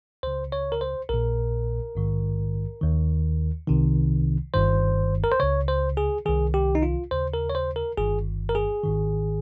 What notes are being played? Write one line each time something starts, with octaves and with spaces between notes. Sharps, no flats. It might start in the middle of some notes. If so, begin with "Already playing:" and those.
C#2 C#3 C5
C#5
A#4
C5
A#1 A#2 A#4
A#1 G#2 D#3
D#2 D#3
C2 C3 D#3
G1 G2 D#3 C5
A#4
C5
C#2 C#3 C#5
C5
G#4
C2 C3 D#3 G#4
G4
D#4
F4
D#2 C#3 C5
A#4
C#5
C5
A#4
G1 G2 D#3 G#4
A#4
G#4
G#1 G#2 D#3